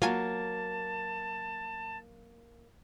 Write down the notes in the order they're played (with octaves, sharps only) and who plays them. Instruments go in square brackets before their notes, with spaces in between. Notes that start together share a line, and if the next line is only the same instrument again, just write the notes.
[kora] F#3 [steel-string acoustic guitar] A#3 [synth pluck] F4 G#5 D#7 [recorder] A5